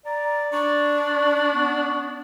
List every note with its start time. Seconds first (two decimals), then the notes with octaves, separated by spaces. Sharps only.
0.06 D5 A#5
0.53 D4 C#6
1.55 B3